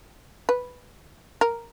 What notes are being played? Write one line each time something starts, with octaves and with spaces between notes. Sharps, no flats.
B4
A#4